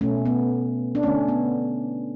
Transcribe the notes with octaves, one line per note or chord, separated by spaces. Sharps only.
B2 A3 C#4
B3
D4
D3 A3 C#4
B3